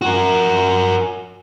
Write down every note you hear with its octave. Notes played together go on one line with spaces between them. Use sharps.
F#4 A#4